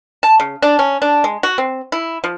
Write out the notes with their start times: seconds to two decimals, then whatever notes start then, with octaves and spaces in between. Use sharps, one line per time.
0.23 A5
0.40 C#3
0.62 D4
0.79 C#4
1.02 D4
1.24 G#3
1.43 F#4
1.58 C4
1.92 E4
2.24 F3